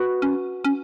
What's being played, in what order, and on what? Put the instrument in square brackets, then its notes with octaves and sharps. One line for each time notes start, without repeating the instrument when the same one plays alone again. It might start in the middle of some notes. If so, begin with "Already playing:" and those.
Already playing: [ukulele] F#4 B4
[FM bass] C#4
C#4